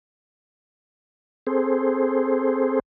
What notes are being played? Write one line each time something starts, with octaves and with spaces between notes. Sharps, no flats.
C4 G#4 A4 C5